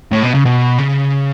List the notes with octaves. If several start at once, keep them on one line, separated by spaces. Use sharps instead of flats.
A2
B2
C#3
B2
C#3